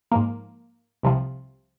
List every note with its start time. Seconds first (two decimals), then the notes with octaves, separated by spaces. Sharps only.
0.12 G#2 F3 A#3
1.03 C2 C3 F3